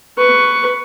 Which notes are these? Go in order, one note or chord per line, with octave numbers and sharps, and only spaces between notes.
B4 C#6